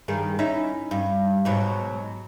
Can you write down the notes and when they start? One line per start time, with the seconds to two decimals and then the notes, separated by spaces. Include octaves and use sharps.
0.08 G2 D#3 G#4
0.39 C#4 D#4 E4
0.91 G2
1.45 G#2 B2 F#3